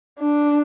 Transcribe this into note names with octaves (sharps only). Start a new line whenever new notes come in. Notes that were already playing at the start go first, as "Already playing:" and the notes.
D4